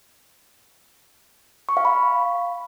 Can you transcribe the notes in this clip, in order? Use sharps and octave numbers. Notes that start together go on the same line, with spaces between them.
C#6
F5
B5